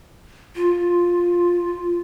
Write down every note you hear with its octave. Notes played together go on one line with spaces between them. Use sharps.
F4